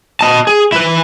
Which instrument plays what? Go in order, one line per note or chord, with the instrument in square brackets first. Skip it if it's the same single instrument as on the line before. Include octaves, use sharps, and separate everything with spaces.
[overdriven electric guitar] D#5 A5
G#4
E4 B4